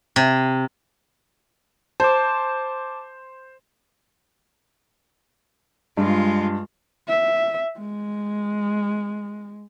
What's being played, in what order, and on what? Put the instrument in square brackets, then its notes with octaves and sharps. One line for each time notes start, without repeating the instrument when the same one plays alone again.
[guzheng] C3
[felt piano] C5 [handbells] A5 D6
[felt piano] G2 [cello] G#3 F4
[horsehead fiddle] E5
G#3